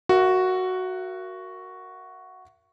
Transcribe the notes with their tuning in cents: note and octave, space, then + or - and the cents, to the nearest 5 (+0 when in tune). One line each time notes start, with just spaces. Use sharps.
F#4 +0 A#4 +0 E5 +40